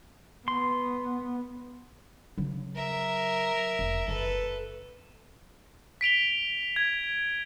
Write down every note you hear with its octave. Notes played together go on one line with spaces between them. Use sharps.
B3 C6
C#3 F#3
A#4 E5
F1
F#1 A4 B4
B6 D7 F7 G7
G#6